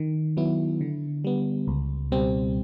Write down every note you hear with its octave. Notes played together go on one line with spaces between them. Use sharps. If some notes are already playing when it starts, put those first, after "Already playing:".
Already playing: D#3
F#3 B3 E4
D3
G3 B3
C#2
B2 G3 C4